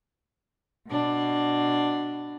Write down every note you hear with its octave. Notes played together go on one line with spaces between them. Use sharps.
B2 D4